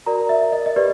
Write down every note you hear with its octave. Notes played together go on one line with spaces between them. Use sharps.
F#4 A#4 D5 A#5
E5
D#5
D#5
G4 B4 D5